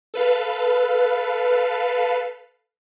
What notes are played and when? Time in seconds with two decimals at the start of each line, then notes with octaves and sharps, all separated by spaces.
0.14 A4 B4 F5